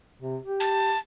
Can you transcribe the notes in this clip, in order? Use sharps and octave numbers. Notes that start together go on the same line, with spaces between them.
C3
G4
A5